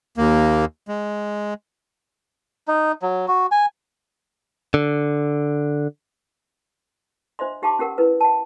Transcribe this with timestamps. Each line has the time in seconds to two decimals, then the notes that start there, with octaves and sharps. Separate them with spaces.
0.18 D#2 A#3
0.88 G#3
2.68 D#4
3.02 F#3
3.28 F#4
3.52 G#5
4.74 D3
7.39 D4 C5 D#5 E5 C6
7.62 D#4 G4 F5 A5 C6 D6
7.79 C#4 G4 A#4 F#5
7.98 E4 A#4 B4
8.21 F#5 A5